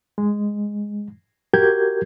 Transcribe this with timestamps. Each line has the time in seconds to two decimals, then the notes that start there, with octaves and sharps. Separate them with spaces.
0.18 G#3
1.53 F#4 G4 A#4 G6 G#6